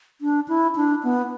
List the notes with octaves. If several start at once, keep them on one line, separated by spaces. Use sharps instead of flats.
D4
E4
D4
B3